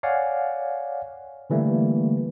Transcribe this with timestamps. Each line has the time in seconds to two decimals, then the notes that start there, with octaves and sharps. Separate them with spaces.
0.03 C#5 D5 F5 F#5 G#5
1.50 D3 E3 G3 A3 A#3